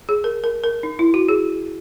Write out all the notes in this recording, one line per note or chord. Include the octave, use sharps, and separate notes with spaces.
G#4
A#4
A#4
A#4
D#4
E4
F#4
G#4